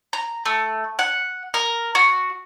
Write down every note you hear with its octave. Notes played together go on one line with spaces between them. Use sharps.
A#5
A3
F#5
A#4
F#4